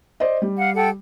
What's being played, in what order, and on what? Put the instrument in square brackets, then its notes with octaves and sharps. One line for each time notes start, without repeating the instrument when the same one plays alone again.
[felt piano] C5 D5 D#5
G3
[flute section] F5 F#5
A4 F#5 G5